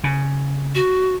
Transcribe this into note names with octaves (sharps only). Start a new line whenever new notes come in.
C#3
F#4